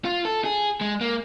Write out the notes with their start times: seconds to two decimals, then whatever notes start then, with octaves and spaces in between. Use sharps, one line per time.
0.05 F4
0.25 A4
0.44 G#4
0.81 G#3
1.01 A#3